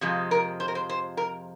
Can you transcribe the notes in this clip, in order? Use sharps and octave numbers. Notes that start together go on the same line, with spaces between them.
F2 C3 F3 G#3
A#4
C5
A#4
C5
C5
A#4